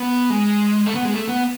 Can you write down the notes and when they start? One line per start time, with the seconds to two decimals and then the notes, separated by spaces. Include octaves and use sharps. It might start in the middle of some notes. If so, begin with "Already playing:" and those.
Already playing: B3
0.30 G#3
0.86 A3
0.95 B3
1.05 G#3
1.14 A3
1.28 B3